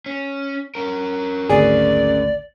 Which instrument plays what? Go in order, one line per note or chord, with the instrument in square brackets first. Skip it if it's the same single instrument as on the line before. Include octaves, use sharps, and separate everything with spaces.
[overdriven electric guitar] C#4
C#4 A#4
[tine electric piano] G#1 D2 [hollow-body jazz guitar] G#4 [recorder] D5